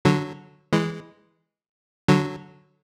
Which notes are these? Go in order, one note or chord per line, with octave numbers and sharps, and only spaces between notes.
D3 F#3
E3 G#3
D3 F#3